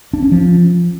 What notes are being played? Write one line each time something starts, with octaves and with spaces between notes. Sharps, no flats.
D4
C#4
F3